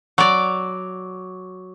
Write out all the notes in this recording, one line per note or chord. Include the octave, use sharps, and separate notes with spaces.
F#3 D5